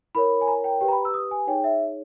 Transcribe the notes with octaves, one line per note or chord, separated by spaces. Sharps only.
E4 A#4 C#5 B5
G#5
A#5
G5
G4 B4 G5
A#5
B5
E6
D#6
G#5
D#4 G#4 C#5 G5
E5